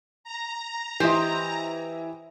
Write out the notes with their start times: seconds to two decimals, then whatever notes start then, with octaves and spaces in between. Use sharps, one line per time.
0.24 A#5
1.00 E3 E4 G4 C5 D#5